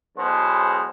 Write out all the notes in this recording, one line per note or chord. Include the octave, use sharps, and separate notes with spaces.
B1 E2 B2 G#3 C5